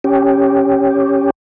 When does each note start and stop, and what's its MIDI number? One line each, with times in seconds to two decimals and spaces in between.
0.04 1.30 61
0.04 1.30 67